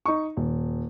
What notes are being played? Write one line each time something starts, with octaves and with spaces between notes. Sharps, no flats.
D#4 C#6
D#1